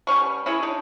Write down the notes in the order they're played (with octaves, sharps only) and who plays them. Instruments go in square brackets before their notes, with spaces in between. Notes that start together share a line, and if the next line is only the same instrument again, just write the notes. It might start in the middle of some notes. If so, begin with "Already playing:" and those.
[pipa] B2 G3 C#4 C#6
C#4 E4 G#4 C#5
D4 D#4